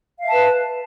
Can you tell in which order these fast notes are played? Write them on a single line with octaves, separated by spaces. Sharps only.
F5 E5 A5 B4